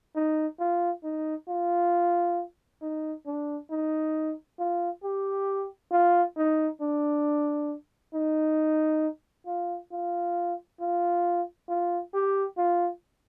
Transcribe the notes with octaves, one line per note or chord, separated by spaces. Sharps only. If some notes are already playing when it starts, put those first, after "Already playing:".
D#4
F4
D#4
F4
D#4
D4
D#4
F4
G4
F4
D#4
D4
D#4
F4
F4
F4
F4
G4
F4